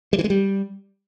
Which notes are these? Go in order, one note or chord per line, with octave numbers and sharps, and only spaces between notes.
G3
E3
G#3
G3